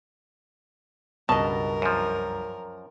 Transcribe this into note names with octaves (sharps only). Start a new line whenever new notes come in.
C#2 G2 B2 A#4 D#5 A5
F#2 F3